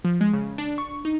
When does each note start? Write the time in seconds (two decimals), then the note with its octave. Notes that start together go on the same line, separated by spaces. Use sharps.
0.05 F3
0.21 G#3
0.33 C#3
0.58 D4
0.78 C#6
1.05 D#4